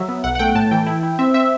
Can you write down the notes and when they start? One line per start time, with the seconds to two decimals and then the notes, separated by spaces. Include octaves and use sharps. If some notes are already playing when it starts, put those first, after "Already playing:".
Already playing: F#3 E5
0.09 B3
0.24 B1 F#5
0.35 F#5
0.39 A3 G5
0.55 A2 A5
0.71 E3 G5
0.86 E4
1.03 E4
1.19 C4 E5
1.34 C4 E5